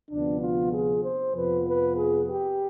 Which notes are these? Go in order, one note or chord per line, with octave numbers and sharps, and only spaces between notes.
D2 C3 F3 B3 D4
F4
G#4
C5
F2 C3 F3 B3 B4
B4
G#4
G4